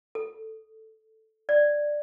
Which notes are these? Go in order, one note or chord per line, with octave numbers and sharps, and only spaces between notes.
A4
D5